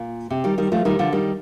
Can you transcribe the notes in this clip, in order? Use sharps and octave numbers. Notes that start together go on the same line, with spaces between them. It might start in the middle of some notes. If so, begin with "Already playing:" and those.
Already playing: A#2
C3
D#3 G3
D#3 G3
F3 A3
D#3 G3
D3 F3
D#3 G3